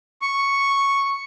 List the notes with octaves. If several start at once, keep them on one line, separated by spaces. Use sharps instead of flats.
C#6